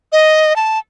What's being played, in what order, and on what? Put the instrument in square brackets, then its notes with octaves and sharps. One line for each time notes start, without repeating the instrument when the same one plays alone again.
[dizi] D#5
A5